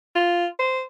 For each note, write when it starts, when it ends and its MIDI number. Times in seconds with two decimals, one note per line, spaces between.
0.15 0.46 65
0.60 0.82 72